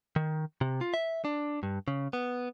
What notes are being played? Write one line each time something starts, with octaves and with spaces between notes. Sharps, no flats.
D#3
C3
F4
E5
D4
G2
C#3
B3